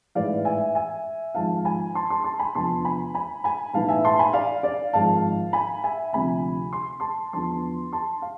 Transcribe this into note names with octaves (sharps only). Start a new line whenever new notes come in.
A1 G#2 E3 D5 F5
E5 G#5
E5 G#5
G#1 G#2 F3 F5 A5
G#5 B5
A5 C6
A5 C6
A5 C6
G#5 B5
F1 E2 D3 F3 A5 C6
G#5 B5
G#5 B5
G#5 B5
B1 A2 E3 F5 A5
E5 G#5
A5 C6
G#5 B5
D5 F5
D5 F5
G#1 G#2 F3 F5 A5
G#5 B5
E5 G#5
D2 C3 F3 G#5 B5
C6
A5 C6
E2 D3 F3 A5 C6
A5 C6
F5